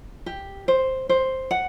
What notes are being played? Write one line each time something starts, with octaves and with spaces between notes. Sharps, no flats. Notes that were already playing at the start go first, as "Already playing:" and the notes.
G4
C5
C5
F#5